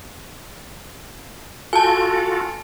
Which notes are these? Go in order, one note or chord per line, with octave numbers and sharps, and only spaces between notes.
F4 F#4 A4 G#5 A5